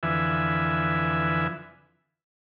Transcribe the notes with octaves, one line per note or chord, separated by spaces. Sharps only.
F2 D3 E3 B4 E5 G#5